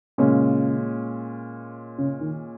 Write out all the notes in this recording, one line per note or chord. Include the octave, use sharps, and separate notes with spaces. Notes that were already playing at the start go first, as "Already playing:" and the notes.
A#2 C#3 G#3 C#4
C#3
D#3